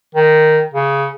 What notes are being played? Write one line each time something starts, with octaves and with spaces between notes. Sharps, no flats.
D#3
C#3